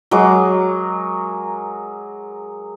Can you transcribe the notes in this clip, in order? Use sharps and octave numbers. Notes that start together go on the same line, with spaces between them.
F#3 G#3 A#4 D6